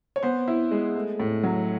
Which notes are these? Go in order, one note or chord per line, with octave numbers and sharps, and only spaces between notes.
C#5
B3 C5
E4
G#3
A3
A2
F#3